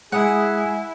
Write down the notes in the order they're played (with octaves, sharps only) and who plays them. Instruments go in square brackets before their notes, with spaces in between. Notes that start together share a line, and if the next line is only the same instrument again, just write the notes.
[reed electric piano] G#3 D#6 [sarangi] E4 [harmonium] G#4 [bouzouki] F#5